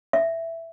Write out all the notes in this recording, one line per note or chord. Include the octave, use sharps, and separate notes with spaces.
E5